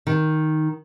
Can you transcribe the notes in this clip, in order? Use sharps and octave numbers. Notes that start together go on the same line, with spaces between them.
D#3